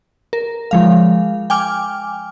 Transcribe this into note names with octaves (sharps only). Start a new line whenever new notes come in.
A#4
F3 G#3 F5
G5 G#5 D6 F6